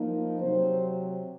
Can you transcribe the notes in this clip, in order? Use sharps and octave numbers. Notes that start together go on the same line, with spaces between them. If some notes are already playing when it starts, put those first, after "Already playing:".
Already playing: F3 A#3 D#4
C3 F#3 C4 C5